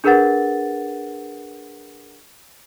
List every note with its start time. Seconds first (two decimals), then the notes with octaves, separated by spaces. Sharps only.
0.04 D4 G#4 A#4 B4 F#5 A6